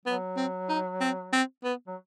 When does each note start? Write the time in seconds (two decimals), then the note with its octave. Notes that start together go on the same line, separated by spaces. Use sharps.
0.06 F#3 B3
0.37 C4
0.69 D#4
1.01 C4
1.33 C4
1.64 B3
1.87 F#3